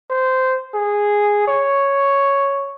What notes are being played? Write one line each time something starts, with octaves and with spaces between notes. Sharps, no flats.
C5
G#4
C#5